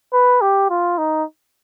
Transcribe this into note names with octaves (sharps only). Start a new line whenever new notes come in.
B4
G4
F4
D#4